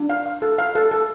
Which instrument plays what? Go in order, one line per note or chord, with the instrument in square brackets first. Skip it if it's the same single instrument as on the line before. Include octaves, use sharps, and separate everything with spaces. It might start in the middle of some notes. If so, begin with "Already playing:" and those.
Already playing: [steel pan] D4
F5
F5
A4
F5
A4
A4